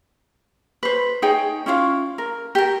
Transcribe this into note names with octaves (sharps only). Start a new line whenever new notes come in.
B4 C5
D#4 G#4 C#5 G5
C#4 E4 F4 F5
A#4
G4 A#4